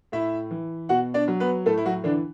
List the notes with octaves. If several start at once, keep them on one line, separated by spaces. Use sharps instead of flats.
A2 E4 E5
E3
B2 F#4 F#5
D4 D5
F#3
B3 B4
A2 A3 A4
E4
F#3 F#4
D3 E3 D4